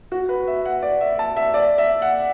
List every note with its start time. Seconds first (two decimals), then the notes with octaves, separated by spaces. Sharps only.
0.12 F#4
0.29 B4
0.47 E5
0.65 F#5
0.82 D5
1.01 E5
1.19 A5
1.36 E5
1.54 D5
1.78 E5
2.02 F#5